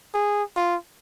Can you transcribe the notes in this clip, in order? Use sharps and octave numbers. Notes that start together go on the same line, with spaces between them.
G#4
F4